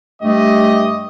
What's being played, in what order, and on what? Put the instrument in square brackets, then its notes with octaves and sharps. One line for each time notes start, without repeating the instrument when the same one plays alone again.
[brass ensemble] G2 G4 D#5 [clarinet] A3